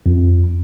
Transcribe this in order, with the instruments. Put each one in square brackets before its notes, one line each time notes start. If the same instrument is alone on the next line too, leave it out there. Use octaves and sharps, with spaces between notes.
[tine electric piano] F2